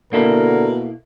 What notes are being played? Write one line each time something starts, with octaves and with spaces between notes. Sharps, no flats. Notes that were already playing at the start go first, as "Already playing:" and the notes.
B2 D3 A#3 E4 A4 A#4